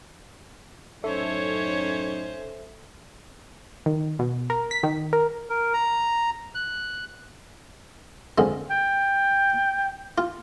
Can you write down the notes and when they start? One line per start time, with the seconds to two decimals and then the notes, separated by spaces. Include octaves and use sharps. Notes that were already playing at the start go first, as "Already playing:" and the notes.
1.04 F#2 A2 C#4 D#4 A4 C5 C#5 E5
3.86 D#3
4.19 B2
4.50 A#4
4.71 B6
4.83 D#3
5.13 A#4
5.49 A#4
5.73 A#5
6.55 F#6
8.38 F2 D3 G#3
8.71 G5
10.18 F4